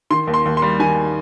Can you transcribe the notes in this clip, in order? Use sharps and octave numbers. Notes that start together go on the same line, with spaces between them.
D#3 C6
D#2
C6
D#2
C6
G3
D#3 G#5